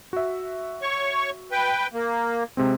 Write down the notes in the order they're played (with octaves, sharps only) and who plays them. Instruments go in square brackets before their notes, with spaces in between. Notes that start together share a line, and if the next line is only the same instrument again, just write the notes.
[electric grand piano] F#4 E5
[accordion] C#5 C#6
B4 G5
A#3
[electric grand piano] C3 G#3 C4